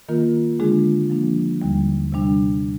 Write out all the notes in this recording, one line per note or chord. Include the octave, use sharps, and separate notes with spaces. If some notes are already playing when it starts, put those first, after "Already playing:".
D#3 A#3 F4 A#4
D3 G#3 D4 F4 G#4
F3 A#3 D4
D#2 D3 G3
C3 G3 D4